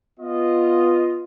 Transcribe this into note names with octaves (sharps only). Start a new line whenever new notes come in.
B3 F4 D#5